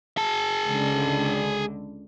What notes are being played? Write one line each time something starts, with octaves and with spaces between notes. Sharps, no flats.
G#4 A5
C#2 D3